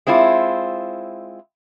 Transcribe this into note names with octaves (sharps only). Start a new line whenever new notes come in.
G#3 C4 E4 F4